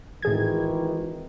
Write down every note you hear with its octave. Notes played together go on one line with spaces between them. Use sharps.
G#1 A2 D#3 E3 G#4 G#6